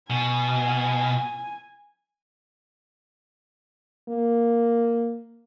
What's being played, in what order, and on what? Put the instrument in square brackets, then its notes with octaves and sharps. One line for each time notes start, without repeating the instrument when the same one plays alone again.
[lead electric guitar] B2 [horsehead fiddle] G#5
[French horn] A#3